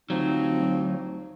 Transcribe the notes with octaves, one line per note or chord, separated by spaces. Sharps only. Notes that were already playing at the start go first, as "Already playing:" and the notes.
D2 F3 F#3 C4 D#4